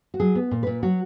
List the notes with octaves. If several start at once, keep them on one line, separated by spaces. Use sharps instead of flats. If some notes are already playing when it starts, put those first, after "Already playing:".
F#4
F#3 G#4
B3
A#2
A#2 B4
F#3 F#4